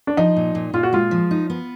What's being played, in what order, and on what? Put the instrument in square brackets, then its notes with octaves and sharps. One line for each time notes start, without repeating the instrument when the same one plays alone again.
[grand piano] D4
[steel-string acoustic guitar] F3 [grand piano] D#4
[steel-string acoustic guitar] A#2
A#2
[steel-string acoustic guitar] A#2 [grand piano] F4
[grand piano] F#4
[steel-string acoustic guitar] G#3 [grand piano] F4
[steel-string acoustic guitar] F3
D#4
B3